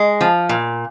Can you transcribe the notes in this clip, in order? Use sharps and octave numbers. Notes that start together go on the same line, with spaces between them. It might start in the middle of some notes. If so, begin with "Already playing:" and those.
Already playing: G#3
F3
A#2